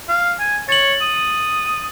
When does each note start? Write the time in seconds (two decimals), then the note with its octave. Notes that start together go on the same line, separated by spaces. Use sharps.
0.09 F5
0.40 G#5
0.69 C#5 A6 F#7
1.01 D#6